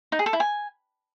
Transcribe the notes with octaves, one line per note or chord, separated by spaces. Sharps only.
D#4
G#4
A4
E4
G#5